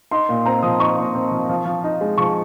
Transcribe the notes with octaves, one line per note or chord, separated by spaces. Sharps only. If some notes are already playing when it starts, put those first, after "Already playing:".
D#4 C6
A#2
C4 A#5
F3 D#6
D#4 C#6
A#2
C4
F3
F3
F3
D#4
G#3
F3 C#6